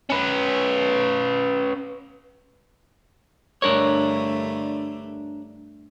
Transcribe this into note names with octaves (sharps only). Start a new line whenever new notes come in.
C#4 B4
G2 D3 A3 D4 A#4 C#5